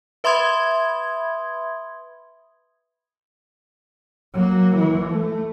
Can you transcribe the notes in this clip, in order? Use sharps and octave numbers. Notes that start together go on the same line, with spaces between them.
B4 E5 B5 C6 D#6 G#6
F#3 A#3
E3
A3